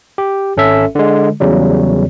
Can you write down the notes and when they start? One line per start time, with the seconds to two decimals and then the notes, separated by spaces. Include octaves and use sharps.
0.18 G4
0.57 G#1 C#4 A4 E5
0.95 D3 G#3
1.40 E2 C#3 F#3 G3